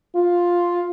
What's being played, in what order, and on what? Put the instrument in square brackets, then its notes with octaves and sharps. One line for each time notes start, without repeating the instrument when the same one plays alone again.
[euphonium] F4